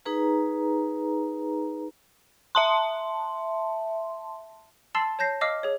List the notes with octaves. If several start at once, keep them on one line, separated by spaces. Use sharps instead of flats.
D#4 G#4 B4 A#5
E5 A5 C6
A5 C6 E6 A6 C7 F#7
C#5 A5 G6 A#6 C7
D#5 F5 D6 E6 F6 C7
G#4 C#5